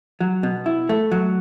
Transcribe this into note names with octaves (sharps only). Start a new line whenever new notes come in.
F#3
B2
E4
A3
F#3